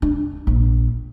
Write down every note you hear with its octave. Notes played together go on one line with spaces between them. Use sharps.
D4
A#1